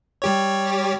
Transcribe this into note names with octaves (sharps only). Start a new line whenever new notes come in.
G3 G4 C#5